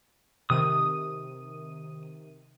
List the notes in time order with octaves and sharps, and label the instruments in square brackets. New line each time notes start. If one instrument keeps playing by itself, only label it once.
[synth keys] C3 D#3 D#7 [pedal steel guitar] D#6